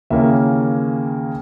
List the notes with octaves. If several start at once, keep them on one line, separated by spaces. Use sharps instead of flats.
D#2 C#3 E3 A#3 C#4 E5